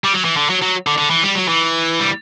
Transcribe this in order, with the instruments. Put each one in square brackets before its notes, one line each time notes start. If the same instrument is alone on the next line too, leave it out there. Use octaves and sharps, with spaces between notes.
[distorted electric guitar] G3
F#3
E3
D3
F#3
F#3
D3
D3
E3
G3
F#3
E3
G3